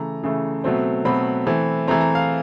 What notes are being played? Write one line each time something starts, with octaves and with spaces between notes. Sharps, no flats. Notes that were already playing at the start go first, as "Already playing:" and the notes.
Already playing: C#3 E3 A3 A#5
C#3 E3 A3
B2 F#3 A3 C4
B2 F#3 A3 C4 B5
E3 A3 C4
E3 A3 C4 A#5
A#5
F5